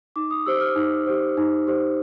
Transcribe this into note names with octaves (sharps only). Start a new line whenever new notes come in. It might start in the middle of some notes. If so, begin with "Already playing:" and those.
D#4 D6
D#6
G4 C5 E6
F6
D#4
G4 C5
D#4
G4 C5